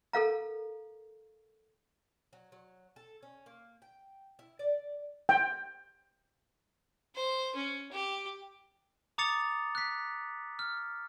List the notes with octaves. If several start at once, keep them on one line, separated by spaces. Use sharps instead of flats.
A4 A#4 F5 A#5
F#3
F#3
A4
C#4
A#3
G5
E4
D5
G5
C5
C#4
G4
A#5 D6 D#6 A6 C#7 F7
F#6 B6
F6